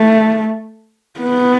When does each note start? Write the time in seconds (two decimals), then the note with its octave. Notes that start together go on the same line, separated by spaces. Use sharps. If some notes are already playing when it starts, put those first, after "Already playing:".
Already playing: A3
1.20 B3